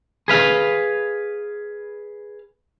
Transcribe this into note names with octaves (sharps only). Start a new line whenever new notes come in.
G#4 B4 F5